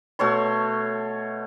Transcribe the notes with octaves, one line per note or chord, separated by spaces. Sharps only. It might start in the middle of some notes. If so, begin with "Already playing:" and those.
B2 A3 C#5 C6